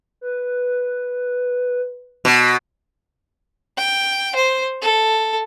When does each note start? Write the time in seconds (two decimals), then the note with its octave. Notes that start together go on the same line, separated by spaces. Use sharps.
0.21 B4
2.25 B2
3.77 G5
4.35 C5
4.82 A4